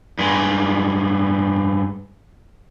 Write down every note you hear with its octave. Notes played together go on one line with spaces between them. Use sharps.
G2 G#3